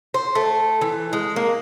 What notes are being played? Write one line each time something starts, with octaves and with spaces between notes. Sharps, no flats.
C5
A3
E3
G#3
A#3